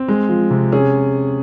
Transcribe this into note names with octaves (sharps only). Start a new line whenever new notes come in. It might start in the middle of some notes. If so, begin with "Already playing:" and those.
Already playing: C4
G#3
F3
C3
C#4 G#4